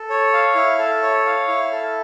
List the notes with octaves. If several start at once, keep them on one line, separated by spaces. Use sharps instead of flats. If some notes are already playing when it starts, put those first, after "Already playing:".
Already playing: A4
C#5
F5
E4
A4
C#5
F5
E4
A4